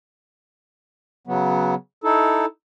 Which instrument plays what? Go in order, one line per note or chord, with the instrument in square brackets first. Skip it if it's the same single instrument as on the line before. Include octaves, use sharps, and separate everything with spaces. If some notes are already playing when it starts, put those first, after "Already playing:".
[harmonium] C#3 F#3 B3
D#4 E4 A4